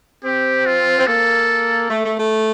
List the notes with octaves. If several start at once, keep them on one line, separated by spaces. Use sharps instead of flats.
C4 G4
F4
C4
A#3 A4
A3
A3
A3